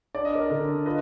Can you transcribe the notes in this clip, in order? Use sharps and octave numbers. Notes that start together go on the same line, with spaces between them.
D4 D5
D#5
A#4 D5
D3
F4 B4 D#5